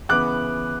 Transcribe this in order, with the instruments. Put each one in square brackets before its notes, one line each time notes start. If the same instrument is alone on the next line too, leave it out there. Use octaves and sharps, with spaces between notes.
[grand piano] C#3 E3 B3 D6 F#6